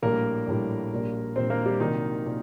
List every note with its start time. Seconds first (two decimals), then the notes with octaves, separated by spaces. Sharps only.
0.02 A#1 A2 G3 A#3 A#4
0.47 A#1 A2 G3
0.91 A#1 A#2 G3
1.36 A#1 A#2 G3 C4 C5
1.50 A#3 A#4
1.66 G3 G4
1.80 C2 A#2 D#3 F#3 D#4
2.26 A#2